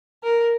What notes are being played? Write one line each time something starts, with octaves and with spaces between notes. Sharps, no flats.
A#4